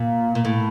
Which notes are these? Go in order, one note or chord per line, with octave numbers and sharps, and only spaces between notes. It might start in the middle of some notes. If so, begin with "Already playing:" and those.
Already playing: A#2
A#2
A2